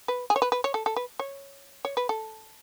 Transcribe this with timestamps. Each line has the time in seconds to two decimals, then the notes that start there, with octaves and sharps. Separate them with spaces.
0.08 B4
0.30 G#4
0.36 C#5
0.42 B4
0.52 B4
0.64 C#5
0.74 A4
0.86 A4
0.96 B4
1.19 C#5
1.85 C#5
1.97 B4
2.09 A4